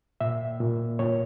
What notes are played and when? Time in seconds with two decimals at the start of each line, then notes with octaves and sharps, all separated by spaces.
0.21 A#2 E5
0.60 A#2
0.99 A#2 C#5